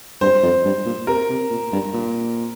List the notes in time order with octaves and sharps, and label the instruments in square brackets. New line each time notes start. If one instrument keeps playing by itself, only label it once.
[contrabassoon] G2 [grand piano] C5
[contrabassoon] F2
G2
A#2
[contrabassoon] C3 [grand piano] A#4
[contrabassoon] C3
A#2
G2
A#2